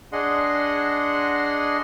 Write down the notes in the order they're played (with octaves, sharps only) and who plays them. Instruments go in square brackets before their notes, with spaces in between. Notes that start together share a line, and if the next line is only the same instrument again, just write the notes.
[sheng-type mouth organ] D4 G#4 D#5 F#5 C6